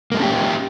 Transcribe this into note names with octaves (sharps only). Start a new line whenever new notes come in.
G#3 A#3 C#4 G4 A4